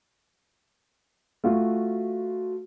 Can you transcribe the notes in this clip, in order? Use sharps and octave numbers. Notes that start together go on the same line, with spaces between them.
A3 F4 F#4